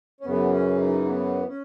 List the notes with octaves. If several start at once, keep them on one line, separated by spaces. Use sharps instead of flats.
C#4
F#2 C#3 E3 B3
C#4
D#4
A#3
B3
C#4